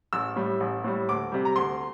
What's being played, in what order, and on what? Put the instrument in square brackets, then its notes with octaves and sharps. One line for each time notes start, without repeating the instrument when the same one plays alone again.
[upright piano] A1 E6
A2 G3
A1
A2 G3
D2 D6
C3 G3
A#5
D2 C6